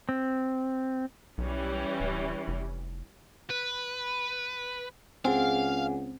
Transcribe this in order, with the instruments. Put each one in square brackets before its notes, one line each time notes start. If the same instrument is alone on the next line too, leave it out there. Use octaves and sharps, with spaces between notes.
[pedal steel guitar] C4
[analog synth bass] B1 [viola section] E3 G3 C#4
[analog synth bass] D1
F1
[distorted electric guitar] B4
[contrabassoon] C#2 [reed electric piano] C4 [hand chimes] G#4 F#5 G#5 [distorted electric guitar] F5